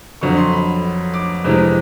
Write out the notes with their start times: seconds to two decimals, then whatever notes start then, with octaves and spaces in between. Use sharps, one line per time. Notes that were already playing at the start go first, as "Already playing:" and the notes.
0.21 F2 D3 F#3 C#6
0.37 C6
0.53 B5
1.14 D6
1.45 F2 C3 E3 G#3